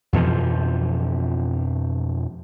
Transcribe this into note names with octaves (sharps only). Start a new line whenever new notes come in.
F2 B2 E3 F3